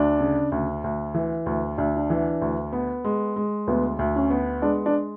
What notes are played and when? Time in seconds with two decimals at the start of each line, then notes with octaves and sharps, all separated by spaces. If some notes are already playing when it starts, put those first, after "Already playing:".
Already playing: D2 D4
0.20 C#3
0.52 D2
0.84 D2
1.14 E3
1.46 D2
1.78 D2 D4
1.96 D4
2.10 E3
2.42 D2
2.72 B3
3.04 G#3
3.36 G#3
3.67 D2 B3
3.99 D2
4.16 C#4
4.30 B3
4.62 G#3 D4
4.86 D4